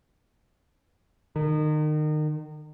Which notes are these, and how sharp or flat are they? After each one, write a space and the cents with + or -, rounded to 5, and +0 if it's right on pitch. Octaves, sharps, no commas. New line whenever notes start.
D#3 -30